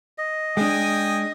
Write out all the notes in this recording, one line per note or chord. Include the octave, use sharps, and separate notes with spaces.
D#5
G#3 D4 G5 G#5 D#6